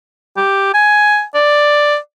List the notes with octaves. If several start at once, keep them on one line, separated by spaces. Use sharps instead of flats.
G4
G#5
D5